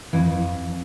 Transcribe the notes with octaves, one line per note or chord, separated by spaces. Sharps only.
F2 E3